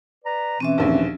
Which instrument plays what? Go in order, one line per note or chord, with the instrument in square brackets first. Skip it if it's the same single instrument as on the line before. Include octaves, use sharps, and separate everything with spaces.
[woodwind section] B4 D5 A#5
[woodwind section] B2 E3 [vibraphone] C4 C#4 E5
[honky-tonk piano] A#1 D#2